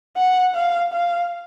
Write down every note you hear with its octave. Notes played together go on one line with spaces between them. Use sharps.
F#5
F5
F5